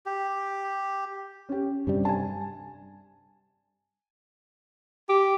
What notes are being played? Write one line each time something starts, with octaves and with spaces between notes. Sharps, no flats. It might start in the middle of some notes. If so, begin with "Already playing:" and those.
G4
C#4 G4
G2 C3 G3
G#5 A5
G4